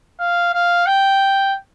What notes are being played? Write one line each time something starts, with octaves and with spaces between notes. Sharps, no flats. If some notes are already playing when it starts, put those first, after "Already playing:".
F5
F5
G5